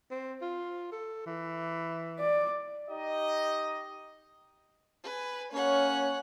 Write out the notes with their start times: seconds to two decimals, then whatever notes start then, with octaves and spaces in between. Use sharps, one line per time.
0.11 C4
0.42 F4
0.92 A4
1.26 E3
2.19 D5
2.89 D#4 G4 D#5
5.03 B4 G#5
5.52 A#3 C#4 C#5 F#5